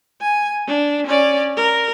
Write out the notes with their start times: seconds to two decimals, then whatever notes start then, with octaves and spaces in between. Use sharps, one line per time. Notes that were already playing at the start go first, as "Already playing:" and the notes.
0.21 G#5
0.67 D4
1.07 C#4 D5
1.57 A#4